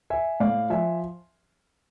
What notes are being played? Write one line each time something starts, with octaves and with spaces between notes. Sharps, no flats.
E5 G#5
A2 D5 F5
F3 E5 G#5